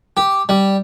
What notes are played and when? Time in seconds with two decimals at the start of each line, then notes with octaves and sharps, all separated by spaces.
0.17 G4
0.49 G3